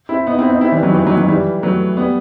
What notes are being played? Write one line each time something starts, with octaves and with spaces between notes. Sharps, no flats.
C4 E4
B3 D#4
C4 E4
B3 D#4
C4 E4
E3 G3
D#3 F#3
E3
D#3 F#3
D#3 F#3
E3 G3
F#3 A3
G3 B3